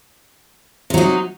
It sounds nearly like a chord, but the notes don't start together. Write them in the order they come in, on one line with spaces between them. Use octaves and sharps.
C3 F#3 D#4